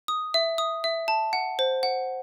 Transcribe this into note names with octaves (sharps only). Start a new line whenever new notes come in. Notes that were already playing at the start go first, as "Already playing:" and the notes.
D#6
E5
D#6
E5
A5
F#5
C5
F#5